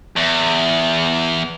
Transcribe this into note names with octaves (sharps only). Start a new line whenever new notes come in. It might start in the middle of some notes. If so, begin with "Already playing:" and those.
E2